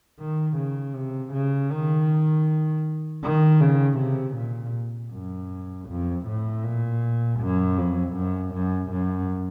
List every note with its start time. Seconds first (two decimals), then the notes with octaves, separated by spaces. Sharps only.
0.20 D#3
0.58 C#3
0.95 C3
1.33 C#3
1.71 D#3
3.23 D#3
3.60 C#3
3.98 C3
4.36 A#2
5.12 F#2
5.89 F2
6.27 A2
6.64 A#2
7.40 F#2
7.77 F2
8.15 F#2
8.54 F#2
8.91 F#2